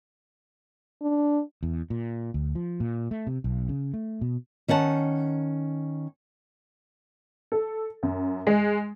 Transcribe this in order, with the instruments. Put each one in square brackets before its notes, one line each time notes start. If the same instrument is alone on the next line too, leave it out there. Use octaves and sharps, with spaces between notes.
[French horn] D4
[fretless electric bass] E2
A#2
D2
F3
A#2
A3
C3
B1
C#3
A3
B2
[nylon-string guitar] D#3 C#4 F#5 A5
[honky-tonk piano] A4
F#2
G#3